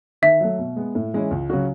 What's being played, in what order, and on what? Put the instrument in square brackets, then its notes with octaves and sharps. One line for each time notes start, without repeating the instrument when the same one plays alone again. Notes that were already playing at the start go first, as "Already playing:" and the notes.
[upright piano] D#3 [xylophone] E5
[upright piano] F#3 A3
B2
G#3 B3
A2
E3 G#3 C#4 E4
C#2
C#3 F#3 C#4 F#4